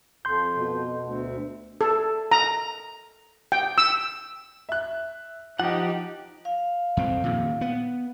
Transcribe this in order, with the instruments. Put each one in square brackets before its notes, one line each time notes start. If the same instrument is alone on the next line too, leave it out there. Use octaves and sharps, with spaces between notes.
[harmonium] F2 [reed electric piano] C6 G6
[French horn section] B2
[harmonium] D2
[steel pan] A4
A#5
G5
E6
[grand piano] E5 F#6
[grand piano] F3 [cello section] D#4 G4 [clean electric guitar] F#5
[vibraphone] F5
[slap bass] F2 C4
A#2 D#3
B3